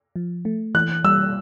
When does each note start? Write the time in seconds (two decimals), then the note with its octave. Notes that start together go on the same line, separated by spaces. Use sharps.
0.16 F3
0.45 A3
0.75 E3 F#6
1.04 G3 E6